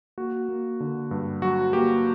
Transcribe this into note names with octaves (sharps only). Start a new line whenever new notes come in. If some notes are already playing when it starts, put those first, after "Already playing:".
A#3 F#4
A#3
D3
G2
F#3 F#4
A#3 G4